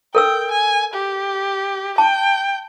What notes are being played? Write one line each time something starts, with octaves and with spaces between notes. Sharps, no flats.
A4 A#4 G5 E6
G#5
G4
G5 A5